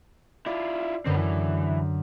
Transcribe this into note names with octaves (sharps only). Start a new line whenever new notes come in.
E4 F4 D5
F#2 D3 C4 B4
E3